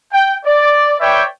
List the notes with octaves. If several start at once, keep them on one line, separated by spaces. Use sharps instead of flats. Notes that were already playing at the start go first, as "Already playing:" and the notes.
G5
D5
B4 C#5 D5 E5 G5